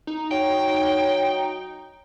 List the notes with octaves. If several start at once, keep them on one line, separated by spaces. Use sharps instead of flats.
D#4
F#3 G5